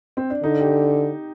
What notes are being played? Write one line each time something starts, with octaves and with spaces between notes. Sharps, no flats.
C4
D4
D3 D#4
G4